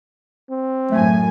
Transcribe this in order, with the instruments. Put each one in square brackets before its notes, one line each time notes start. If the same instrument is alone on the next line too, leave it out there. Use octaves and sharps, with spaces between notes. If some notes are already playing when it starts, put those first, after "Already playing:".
[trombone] C4
[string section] F#2 A2 G#5 [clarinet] A3